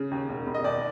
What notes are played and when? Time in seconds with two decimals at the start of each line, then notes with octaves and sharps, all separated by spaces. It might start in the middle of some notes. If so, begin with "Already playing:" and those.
Already playing: C#3
0.11 D#2
0.29 E1
0.46 E1
0.54 D#5
0.64 D#2 D5